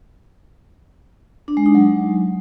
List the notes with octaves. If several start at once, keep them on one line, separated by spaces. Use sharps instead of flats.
D4
G#3
D#4
F#3